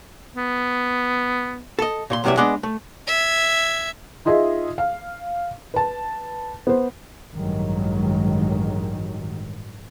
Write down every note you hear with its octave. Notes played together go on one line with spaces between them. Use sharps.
B3
A4 D#5
A#2 C#5 C6
F#2 C3 E3 G3 D5 E5
G#3 B3 D4 D5 D#5
A3
E5 G#6
D#4 F4 G#4 D#5 E5
F5
B4 A5
B3 C5
A1 G2 D#3 F#3 G#3